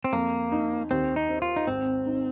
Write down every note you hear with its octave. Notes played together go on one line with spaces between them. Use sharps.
C4
F2 A#3
D#4
D#2 C4
D#4
C4
F4
D#4
G#1 C4
D#4